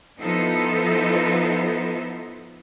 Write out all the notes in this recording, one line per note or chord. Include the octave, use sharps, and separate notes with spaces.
F3 B3 D#4 E4 A4 C5